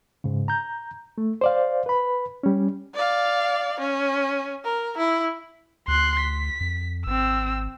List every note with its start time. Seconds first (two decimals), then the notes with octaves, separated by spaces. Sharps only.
0.24 G#2 C#3
0.48 A#5 G6
1.18 A3
1.41 C5 D5 F5
1.86 B4 B5
2.43 G3 C#4
2.95 D5 F5
3.80 C#4
4.64 A#4
4.97 E4
5.88 D2 C6 F#6
6.20 B6
6.60 F2
7.07 G#1 C4 E6